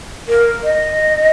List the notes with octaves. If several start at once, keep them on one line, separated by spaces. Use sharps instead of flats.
A#4
D#5